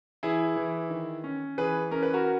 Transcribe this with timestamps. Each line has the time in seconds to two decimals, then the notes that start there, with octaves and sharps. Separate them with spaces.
0.23 E3 E4 G#4
0.56 E3
0.90 D#3
1.24 C#4
1.58 E3 G#4 B4
1.91 C#4 A#4
2.03 B4
2.14 F#4 A#4